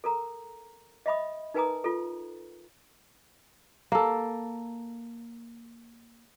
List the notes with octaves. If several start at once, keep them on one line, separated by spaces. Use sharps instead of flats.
A4 A#4 A#5
D#5 E5 B5 D#6
D#4 A#4 B4 G#5 A#5 D#6
F4 A4
A#3 A4